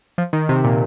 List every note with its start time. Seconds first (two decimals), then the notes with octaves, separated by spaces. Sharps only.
0.18 F3
0.33 D#3
0.49 C3
0.64 A#2